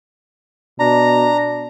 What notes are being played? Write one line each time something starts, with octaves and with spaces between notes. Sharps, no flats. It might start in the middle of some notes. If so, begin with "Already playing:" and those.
B2 D4 A#5